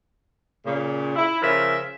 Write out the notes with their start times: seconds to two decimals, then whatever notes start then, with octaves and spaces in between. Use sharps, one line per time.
0.66 A#2 C#3
1.16 E4
1.42 C#3 F3 F4 A#4 E5